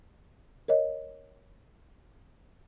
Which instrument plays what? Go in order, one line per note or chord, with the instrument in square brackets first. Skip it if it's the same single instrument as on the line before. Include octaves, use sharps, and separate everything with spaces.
[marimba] A#4 C#5 D#5